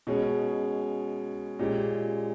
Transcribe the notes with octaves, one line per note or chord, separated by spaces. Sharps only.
B2 G#3 C#4 G#4
A#2 G#3 C#4 G4